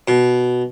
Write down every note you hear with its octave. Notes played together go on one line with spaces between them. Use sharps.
B2